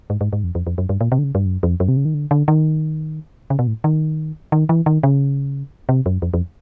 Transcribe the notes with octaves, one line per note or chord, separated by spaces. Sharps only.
G#2
G#2
G#2
F2
F2
F2
F#2
G2
A#2
C3
D3
C#3
G2
F#2
F2
F#2
C3
C#3
D#3
D3
D3
D#3
C#3
B2
A2
D#3
D#3
E3
D#3
C#3
C3
F#2
F2
F2